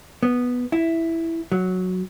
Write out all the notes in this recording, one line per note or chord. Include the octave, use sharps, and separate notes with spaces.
B3
E4
F#3